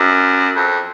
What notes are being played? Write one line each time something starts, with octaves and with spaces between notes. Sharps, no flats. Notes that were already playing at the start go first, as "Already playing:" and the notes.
Already playing: F#2
F2